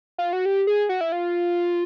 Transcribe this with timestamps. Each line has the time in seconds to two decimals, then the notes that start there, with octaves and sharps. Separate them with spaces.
0.18 F4
0.33 F#4
0.45 G4
0.67 G#4
0.89 F#4
1.01 E4
1.12 F4